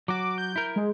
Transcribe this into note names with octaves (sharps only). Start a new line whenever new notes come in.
F#3 F#4 D6
G6
E4 A#4
G#3